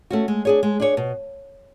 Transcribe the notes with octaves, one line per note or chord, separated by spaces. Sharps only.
A3 C#4 F#4
G#3
D4 G#4 C#5
G#3
D4 G#4 C#5
B2